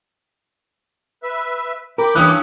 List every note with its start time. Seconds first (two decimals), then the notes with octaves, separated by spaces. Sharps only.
1.23 B4 E5
1.98 A#4 G5 B5 D6
2.15 G2 E3 C#4 D#6 F#6